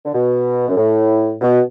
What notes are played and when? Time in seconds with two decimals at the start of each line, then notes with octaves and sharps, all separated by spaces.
0.05 D3
0.14 B2
0.68 F#2
0.77 A2
1.41 B2